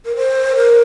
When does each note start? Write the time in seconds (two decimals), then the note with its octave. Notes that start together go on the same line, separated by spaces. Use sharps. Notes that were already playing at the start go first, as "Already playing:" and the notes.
0.05 A#4
0.16 C5
0.56 A#4